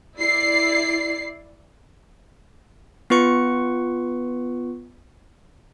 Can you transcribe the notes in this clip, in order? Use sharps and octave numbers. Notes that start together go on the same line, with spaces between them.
E4 D5 C7
B3 F4 B4 C#6 C#7